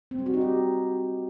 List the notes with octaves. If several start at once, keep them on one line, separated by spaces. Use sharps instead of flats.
C4
G3
F#4
D#4
G4